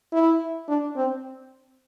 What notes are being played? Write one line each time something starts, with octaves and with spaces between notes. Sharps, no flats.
E4
D4
C4